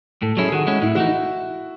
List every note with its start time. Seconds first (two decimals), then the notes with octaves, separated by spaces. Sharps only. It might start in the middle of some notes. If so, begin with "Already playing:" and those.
0.22 A2 A4
0.37 F#3 C#4 E4 G#4
0.48 G#4
0.52 D#3 F#4
0.67 G#3 C#4 E4
0.82 A2 E4
0.95 E3 A3 D#4 F#4
1.08 E4